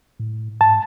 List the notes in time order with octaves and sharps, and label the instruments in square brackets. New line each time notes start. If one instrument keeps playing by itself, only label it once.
[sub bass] A2
[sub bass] G#2 [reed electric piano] A5